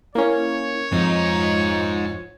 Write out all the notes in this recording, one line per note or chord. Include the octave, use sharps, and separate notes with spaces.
A#3 C#4 E4 C#5
F2 G#2 D#4 F4